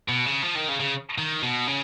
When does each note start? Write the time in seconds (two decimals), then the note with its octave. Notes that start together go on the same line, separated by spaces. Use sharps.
0.09 B2
0.26 C#3
0.43 F3
0.55 D#3
0.68 C#3
0.80 C#3
1.18 D#3
1.43 B2
1.67 C#3